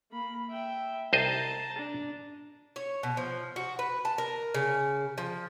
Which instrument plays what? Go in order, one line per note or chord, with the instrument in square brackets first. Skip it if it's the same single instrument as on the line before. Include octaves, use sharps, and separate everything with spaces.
[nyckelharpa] A#3 B5
E5 G5
[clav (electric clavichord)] C2 C5 D#5 [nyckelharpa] A5 A#5
[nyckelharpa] D4
[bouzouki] C#5
B2
F3
F#4
B4
A5
A#4
C#3
F3